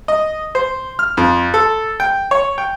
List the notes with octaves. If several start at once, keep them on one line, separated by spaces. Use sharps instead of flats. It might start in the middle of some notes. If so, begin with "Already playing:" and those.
D#5
C5
F6
F2
A4
G5
C#5
G5